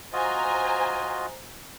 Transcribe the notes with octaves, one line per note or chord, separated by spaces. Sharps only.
F4 F#4 C5 D#5 G#5 A#5